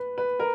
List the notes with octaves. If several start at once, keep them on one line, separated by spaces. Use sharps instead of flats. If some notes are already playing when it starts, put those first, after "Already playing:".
Already playing: B4
B4
A#4